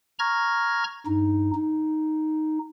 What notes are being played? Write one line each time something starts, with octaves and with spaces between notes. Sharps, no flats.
A#5 C#6 F6 G#6 A#6
G2 D#4
D#4